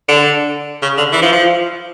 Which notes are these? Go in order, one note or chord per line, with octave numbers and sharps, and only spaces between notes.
D3
C#3
D3
E3
F3
F3